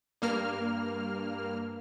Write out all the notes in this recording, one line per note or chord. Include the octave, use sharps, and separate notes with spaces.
G2 A#3 F6